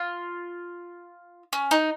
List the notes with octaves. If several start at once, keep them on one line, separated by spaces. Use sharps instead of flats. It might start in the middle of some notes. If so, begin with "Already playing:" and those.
Already playing: F4
C#4
D#4